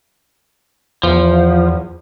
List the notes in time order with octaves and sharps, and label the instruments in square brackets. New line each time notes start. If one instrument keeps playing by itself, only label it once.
[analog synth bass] E2 [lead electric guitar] F3